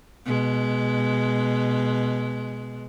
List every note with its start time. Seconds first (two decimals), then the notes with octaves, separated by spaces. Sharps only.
0.26 B2 G#3